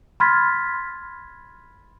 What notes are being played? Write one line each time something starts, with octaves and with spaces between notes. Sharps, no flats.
B5 C6 F6 G#6 A6 B6